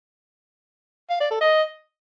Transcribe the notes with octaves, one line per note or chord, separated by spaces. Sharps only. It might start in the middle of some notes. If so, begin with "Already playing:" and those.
F5
D5
A4
D#5